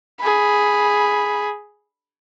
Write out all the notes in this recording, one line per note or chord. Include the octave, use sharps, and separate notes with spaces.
G#4 B5